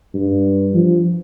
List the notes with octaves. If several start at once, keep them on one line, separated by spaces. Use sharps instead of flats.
G2
F3